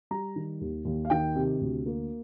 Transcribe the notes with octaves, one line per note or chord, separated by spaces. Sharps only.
G3 A#5
D#3
D#2
D#2
F5
D#3 G5
C3
D2
A#3